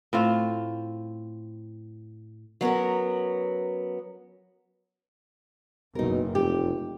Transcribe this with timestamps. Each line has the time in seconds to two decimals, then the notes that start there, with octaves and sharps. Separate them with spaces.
0.13 A2 C4 F4
2.61 F#3 B3 C#4 A#4
5.95 F#1 B2 D#4 A#4
6.35 F1 G4